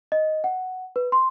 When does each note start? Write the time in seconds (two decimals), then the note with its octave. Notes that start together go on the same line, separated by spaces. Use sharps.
0.12 D#5
0.44 F#5
0.96 B4
1.12 C6